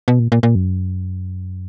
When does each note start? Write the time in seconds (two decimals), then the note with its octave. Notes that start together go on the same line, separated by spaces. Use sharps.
0.08 B2
0.19 A#2
0.32 A#2
0.43 A#2
0.55 F#2